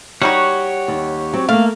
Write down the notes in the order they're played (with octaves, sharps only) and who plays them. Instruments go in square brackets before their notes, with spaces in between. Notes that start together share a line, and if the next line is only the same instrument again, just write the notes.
[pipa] G3 D#4 F#4 [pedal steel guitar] G4 C#5 F#5
[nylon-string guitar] D#2
F#3 C4
[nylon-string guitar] A3 A#3 [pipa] F5